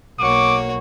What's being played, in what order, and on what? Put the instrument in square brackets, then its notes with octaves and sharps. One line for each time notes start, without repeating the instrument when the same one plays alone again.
[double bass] B1 A#3 [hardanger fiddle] F#4 C#5 [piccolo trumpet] D6